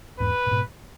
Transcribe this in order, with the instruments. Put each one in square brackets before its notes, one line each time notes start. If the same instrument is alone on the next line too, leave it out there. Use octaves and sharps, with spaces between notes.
[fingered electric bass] E2 G#2 [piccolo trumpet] B4
[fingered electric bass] A2
G#2 B2